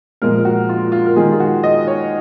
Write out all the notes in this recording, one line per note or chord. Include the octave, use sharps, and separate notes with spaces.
A#2 F3 G#3 A#4
F#4
F4
F4
A#4
D#3 G#3 G#4
F4
F#4
D#5
C#5